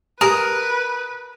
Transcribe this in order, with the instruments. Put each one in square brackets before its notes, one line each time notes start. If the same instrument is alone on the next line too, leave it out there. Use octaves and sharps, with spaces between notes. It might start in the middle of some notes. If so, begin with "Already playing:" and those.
[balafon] G4 [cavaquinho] A#4 [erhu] B4 [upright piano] D#6